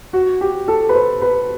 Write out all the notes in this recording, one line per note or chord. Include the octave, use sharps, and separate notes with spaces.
F#4
G4
A4
B4
C5
B4